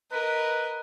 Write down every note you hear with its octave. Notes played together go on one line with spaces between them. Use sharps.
A#4 B4 D#5